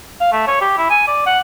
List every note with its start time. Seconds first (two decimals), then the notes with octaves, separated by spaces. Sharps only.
0.21 F5
0.32 A3
0.47 C#5
0.61 G4
0.78 E4
0.90 G#5
1.07 D5
1.26 F#5